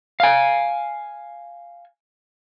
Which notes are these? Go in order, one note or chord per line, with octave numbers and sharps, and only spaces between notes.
F5 G#5